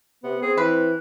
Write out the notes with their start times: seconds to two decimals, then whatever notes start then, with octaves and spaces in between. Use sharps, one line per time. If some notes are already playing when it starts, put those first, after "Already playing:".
0.24 C3 B3
0.42 C4 G#4
0.57 E3 B4